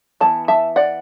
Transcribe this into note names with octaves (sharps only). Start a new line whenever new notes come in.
E3 B3 A5
E5 A5
D5 F#5